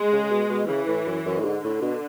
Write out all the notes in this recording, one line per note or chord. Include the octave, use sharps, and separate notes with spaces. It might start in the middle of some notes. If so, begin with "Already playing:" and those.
Already playing: G#3
C#3
C#3
B2
B2
C#3 E3
A2
F#2
F#2
A2
G#2 D3
A2
B2